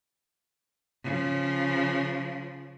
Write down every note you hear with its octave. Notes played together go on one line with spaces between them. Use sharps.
C#3 F3